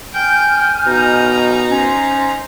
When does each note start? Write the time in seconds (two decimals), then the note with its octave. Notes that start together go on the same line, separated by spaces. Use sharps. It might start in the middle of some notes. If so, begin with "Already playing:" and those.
0.13 G5 G#5 F6 G6
0.88 B2 D#4 A#5
1.71 C#4 C5